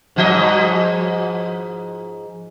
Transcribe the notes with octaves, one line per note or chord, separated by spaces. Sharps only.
G#2 F3 D#5